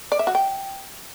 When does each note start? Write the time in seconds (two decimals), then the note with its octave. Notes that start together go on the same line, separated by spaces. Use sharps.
0.12 D5
0.19 E5
0.27 F#4
0.35 G5